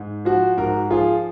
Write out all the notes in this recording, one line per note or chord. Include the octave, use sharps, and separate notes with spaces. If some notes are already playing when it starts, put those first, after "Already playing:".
Already playing: G#2
F3 F#4
G#2 F#4 A#4
F3 F4 G#4